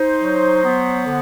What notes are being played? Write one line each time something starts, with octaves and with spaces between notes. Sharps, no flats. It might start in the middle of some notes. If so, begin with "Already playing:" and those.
Already playing: D#4 C5
F#3
B3
D3